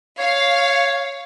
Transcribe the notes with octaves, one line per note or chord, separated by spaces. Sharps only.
C#5 F5